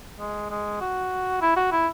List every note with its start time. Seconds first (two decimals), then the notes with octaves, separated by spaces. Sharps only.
0.19 G#3
0.50 G#3
0.81 F#4
1.41 E4
1.56 F#4
1.72 E4